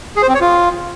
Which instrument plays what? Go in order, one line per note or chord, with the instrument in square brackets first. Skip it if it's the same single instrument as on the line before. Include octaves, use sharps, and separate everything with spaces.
[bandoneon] G#4
C5
C4
C#5
F4